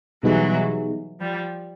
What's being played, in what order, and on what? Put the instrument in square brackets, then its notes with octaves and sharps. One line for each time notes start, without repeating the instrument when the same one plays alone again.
[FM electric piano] B2 G3 B3 D#4 G#4 [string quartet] E3 F#3
[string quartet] F3 G3